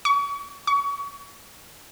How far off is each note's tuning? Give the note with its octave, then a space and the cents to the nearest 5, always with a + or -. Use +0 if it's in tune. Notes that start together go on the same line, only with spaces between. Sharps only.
C#6 +40
C#6 +35